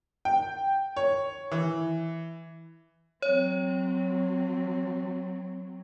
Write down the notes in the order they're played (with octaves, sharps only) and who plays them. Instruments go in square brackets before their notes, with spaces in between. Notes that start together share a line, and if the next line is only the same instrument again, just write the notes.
[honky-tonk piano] G5
C#5
E3
[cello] F#3 C4 [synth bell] C#5